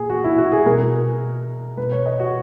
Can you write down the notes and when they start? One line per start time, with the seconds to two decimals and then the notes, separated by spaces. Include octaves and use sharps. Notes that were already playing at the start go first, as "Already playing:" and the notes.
Already playing: A#2 G#4
0.10 F#4
0.24 E4
0.38 F#4
0.52 G#4
0.66 B2 A#4
1.77 B2 B4
1.92 C#5
2.06 D#5
2.20 F#4